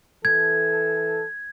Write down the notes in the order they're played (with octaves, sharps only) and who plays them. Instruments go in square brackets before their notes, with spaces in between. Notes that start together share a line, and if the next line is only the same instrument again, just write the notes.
[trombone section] E3 A4 [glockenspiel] G#6